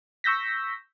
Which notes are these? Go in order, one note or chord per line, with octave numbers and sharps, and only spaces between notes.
C#6 E6 G6 A#6 B6